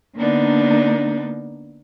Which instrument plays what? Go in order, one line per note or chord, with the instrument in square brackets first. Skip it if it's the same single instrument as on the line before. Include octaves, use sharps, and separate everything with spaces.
[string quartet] D3 A#3 B3 D4 D#4